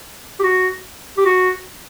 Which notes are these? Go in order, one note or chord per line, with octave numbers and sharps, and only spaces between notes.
G4
F#4
G4
F#4